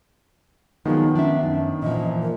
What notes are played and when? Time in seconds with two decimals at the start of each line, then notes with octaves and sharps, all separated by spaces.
0.86 D#3 F3 F#3 G#3 B3 D#4
1.15 C#4 D4 E5
1.43 F#2
1.82 A#2 E3 F3 D#5
2.22 A#4